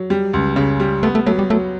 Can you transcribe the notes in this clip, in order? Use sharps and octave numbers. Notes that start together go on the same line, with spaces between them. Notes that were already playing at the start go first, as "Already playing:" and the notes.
Already playing: F#3
G3
C#2
C#3
G3
A3 B3
A3
F#3 A3
G3
F#3 A3